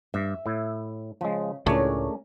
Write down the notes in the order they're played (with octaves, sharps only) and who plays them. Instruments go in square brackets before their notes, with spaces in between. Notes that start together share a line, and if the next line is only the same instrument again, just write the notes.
[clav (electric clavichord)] G2 [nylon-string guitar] E5
[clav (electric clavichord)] A2 E4
[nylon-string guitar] C#3 [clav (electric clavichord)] F3 G#3
[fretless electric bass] C#2 A2 [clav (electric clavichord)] A3 D4 C#5 [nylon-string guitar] C#4 G#4 A#4